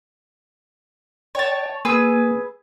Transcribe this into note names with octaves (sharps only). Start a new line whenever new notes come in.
C#5 D5 G5 A5
A#3 G#4 B4 E6